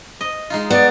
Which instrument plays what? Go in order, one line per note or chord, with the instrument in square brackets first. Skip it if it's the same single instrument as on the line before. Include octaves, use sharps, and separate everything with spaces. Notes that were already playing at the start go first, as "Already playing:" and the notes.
[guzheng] D#5
G#3 D#4 F4
[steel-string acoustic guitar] B3 [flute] D5